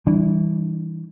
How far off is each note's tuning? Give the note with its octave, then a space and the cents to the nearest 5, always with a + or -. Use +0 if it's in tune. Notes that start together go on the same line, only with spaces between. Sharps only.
E3 -20 G3 +0 D4 +20